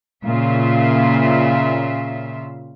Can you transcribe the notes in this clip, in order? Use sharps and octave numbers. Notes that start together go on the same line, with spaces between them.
A#2 C#3 F4 E5